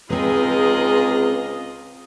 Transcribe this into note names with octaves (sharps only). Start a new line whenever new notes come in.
C#2 C3 C4 D#4 F4 G#4 B4 D#5